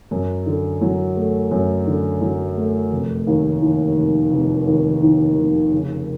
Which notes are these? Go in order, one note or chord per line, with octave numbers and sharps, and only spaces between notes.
F#2
D3
F#3
A3
F#2
D3
F#3
A3
F1
D#2
D#3
F1
F1
D#2
D#3
F1
C#3